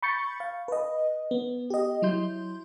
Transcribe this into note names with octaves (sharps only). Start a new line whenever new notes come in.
B5 C#6 G6 A6 C#7
F5
B4 D#5
B3
G4 D#5
F#3 E4 C6 G6